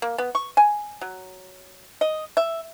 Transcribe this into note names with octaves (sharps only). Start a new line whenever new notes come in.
A#3
B3
C#6
G#5
F#3
D#5
E5